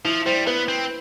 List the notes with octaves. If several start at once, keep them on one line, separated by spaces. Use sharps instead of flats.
F3 E4
G3 C5
B3 B4
C4